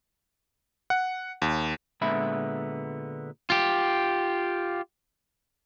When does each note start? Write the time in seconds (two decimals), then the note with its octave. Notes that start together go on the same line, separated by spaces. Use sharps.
0.90 F#5
1.42 D#2
2.01 A#2 D3 G#3 B3 E5 B5
3.50 F4 G4